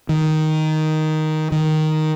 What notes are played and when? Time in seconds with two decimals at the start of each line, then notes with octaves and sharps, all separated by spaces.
0.09 D#3
1.52 D#3